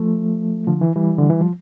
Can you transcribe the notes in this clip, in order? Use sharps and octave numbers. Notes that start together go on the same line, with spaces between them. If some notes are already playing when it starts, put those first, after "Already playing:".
Already playing: F3 A3
D3 F3
E3
E3 G3
D3
E3
F3